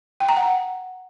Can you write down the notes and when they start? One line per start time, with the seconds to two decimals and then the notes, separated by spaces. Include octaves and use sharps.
0.20 G5
0.29 A#5
0.37 F#5